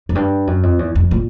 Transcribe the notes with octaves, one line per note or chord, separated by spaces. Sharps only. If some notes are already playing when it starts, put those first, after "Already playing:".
F#2
G2
F#2
F2
E2
F2
A#2